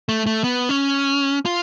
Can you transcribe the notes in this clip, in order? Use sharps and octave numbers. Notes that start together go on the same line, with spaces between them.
A3
A3
B3
C#4
F4